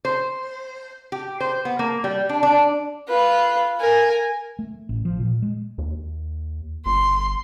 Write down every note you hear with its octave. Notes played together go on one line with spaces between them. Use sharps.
C5
G4
C5
B3
A#3
G3
D4
D4
F4 B4
A#4 G#5
A3
A1
F3
A#2
G#3
D#2
G1 C6